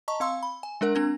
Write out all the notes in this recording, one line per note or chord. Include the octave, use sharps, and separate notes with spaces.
D#5 A5 A#5 C#6
C4 F5 C6 E6
B5
G#5
G#3 D4 A#4 F#5
C4 D4 G#6